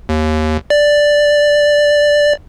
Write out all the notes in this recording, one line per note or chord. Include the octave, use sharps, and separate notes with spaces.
D#2
D5